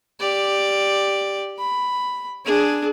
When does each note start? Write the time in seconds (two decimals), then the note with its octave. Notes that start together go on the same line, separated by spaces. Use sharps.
0.20 G4 D5
1.59 B5
2.45 D4 G#4